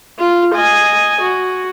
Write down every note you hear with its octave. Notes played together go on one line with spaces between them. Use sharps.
F4
D#5 G#5
F#4